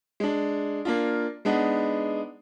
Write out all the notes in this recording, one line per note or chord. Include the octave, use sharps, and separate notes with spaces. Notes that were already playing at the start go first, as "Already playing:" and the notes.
G#3 D4
A#3 D4 F4
G#3 B3 D4 D#4